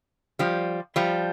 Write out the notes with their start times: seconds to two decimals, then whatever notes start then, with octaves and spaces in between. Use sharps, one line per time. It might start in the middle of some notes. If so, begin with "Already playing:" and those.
0.39 F3 G3
0.96 F3 G3